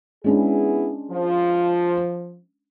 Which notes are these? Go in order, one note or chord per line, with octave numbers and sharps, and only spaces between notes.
G#3 B3 C#4 D4 E4 G#4
F3